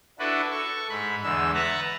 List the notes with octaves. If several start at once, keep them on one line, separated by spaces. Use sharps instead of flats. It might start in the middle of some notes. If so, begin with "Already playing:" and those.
D4 E4 F#4 A4 B4
A4 C#6
G#2 B5
E2 D3 G#3 E6
B4 E5 F#5 A5 A#5 F#6